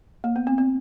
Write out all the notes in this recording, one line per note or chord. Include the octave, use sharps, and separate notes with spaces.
A#3
B3
C4
C4